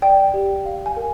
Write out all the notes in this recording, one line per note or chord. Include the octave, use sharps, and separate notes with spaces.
D5 G5
G4
F5
G#5
A#4